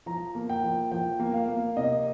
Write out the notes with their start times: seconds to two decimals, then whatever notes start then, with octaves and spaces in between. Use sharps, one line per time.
0.06 F3 A#5
0.35 A#3
0.49 G5
0.64 F3
0.91 F3 G5
1.20 A#3
1.34 F5
1.48 A#3
1.77 C3 D#5